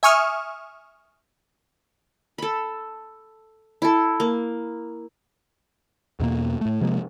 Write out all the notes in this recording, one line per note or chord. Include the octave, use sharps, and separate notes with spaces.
E5 G#5 C#6 D#6 F6
A4 B5
E4 A4
A#3
E2 B2 A#3
A2 A3
C3 F3 G#3 A#3